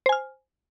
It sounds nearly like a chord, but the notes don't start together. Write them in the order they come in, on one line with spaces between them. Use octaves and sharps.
C5 G#5 F6